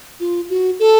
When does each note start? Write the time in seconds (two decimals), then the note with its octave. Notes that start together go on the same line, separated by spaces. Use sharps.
0.20 F4
0.50 F#4
0.79 A4